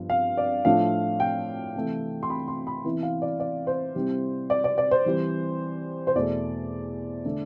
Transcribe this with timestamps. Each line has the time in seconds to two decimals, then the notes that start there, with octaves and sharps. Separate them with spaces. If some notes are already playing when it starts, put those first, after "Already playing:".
Already playing: G2 F3 B3 F4
0.10 F5
0.37 D5
0.65 A2 F3 A3 D4 F4 F5
1.20 G5
1.75 C3 E3 A3
2.23 C6
2.30 B5
2.48 C6
2.67 B5
2.85 C3 E3 B3 E4
3.03 F5
3.22 D5
3.40 D5
3.67 C5
3.95 C3 G3 C4 E4
4.50 D5
4.64 D5
4.78 D5
4.91 C5
5.05 E3 G3 C4
6.07 C5
6.15 E2 B2 A3 D5
7.25 D3 A3